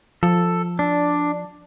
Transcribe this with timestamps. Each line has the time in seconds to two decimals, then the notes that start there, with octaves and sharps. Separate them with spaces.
0.23 F3 A4
0.79 D4